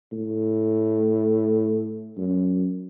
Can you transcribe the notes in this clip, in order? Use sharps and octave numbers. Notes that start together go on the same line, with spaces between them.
A2
F#2